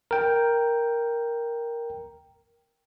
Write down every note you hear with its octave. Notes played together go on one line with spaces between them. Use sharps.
A#4 G5